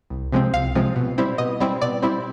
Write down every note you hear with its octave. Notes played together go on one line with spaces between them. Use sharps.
C2
C3 F3 G#3 C4
C2 F5
C3 F3 G#3 C4
B2
G3 C4 E4
B2 D#5
G3 C4 E4
B2 D5
G3 C4 E4